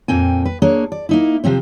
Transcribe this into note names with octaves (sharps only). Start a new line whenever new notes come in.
F2 A#2 C4 G5 G#5
B4
A#3 D4 G#4 C#5
D5
A#3 D#4 E4
C3 F3 C4 C5